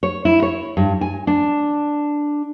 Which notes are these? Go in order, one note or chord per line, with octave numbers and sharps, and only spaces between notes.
C#5
E4
C#5
G2
G#5
D4